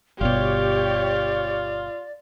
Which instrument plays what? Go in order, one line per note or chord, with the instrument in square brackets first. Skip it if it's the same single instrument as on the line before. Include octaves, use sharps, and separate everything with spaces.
[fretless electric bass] G1 B2 [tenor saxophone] F4 [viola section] G4 C#5 [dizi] D5